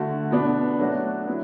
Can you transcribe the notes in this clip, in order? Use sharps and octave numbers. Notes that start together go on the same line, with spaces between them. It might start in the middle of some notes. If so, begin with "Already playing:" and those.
Already playing: D3 A3 F#4
B2 B3 D4
F#3 A3 D4 F#4
F#3 B3 E4